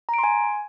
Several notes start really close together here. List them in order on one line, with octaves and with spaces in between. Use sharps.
A#5 D7 C6 G#5